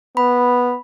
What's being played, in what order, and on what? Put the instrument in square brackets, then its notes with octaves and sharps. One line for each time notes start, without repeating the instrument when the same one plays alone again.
[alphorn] B3 [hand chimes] B5